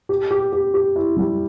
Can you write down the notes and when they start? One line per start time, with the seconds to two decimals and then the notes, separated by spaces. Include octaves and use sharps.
0.09 G4
0.31 G4
0.52 G4
0.74 G4
0.96 E4
1.17 G3